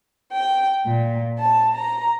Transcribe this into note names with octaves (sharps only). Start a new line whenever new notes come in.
G5
A#2
A5
A#5